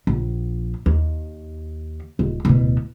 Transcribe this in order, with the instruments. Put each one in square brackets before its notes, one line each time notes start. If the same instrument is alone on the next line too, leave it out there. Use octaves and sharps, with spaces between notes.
[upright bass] A#1
D#2
D#1
D1 B2